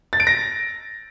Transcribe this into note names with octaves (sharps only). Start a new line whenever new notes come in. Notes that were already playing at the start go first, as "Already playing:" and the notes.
A6
D7
A#6